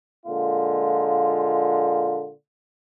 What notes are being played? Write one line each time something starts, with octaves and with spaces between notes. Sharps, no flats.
A#2 D3 G#3 A#3 F4